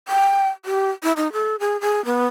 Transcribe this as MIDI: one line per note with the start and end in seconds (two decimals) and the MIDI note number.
0.08 0.49 79
0.65 0.89 67
1.03 1.12 64
1.17 1.31 63
1.33 1.56 69
1.60 1.80 68
1.81 2.04 68
2.05 2.27 59